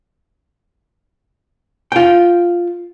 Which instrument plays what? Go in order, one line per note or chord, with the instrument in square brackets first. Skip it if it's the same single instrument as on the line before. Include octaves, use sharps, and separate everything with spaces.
[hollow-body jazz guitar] F4 G5